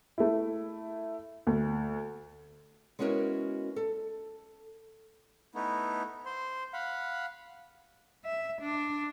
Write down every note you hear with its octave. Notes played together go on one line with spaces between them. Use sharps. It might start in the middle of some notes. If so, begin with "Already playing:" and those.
A3 E4
D2
G#3 B3 C#4 E4 F#4 A#4
A4
A3 B3 D#4 E4
C5 C6
F5 F#5 B5
E5
D4